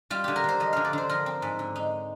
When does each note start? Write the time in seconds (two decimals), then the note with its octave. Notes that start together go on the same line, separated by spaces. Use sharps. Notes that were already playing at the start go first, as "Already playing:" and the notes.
0.10 G3 F4
0.24 D3 G4
0.36 A#4
0.44 D3 C5
0.60 F3 D#5
0.73 D3 F5
0.85 D5
0.93 D3 C5
1.09 F3 A#4
1.26 C4
1.42 G#2
1.59 D3
1.76 D#4